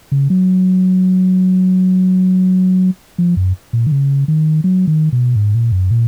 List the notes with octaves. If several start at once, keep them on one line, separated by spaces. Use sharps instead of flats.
C#3
F#3
F3
F#2
A#2
D#3
C#3
D#3
F#3
D#3
B2
G#2
A#2
F#2
A#2